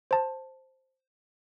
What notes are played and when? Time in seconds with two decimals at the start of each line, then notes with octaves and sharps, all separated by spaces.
0.11 C5 A5